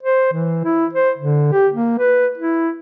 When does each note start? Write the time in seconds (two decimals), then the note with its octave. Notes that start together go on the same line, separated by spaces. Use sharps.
0.03 C5
0.33 E3
0.64 E4
0.93 C5
1.17 D3
1.52 G4
1.73 A#3
1.99 B4
2.38 E4